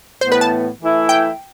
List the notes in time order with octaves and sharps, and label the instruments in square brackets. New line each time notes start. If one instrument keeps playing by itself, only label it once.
[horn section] A2 E3 B3 [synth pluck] C5
[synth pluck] B4
A5
[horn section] E3 A3 E4
[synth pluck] G5